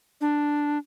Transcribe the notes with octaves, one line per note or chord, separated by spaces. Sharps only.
D4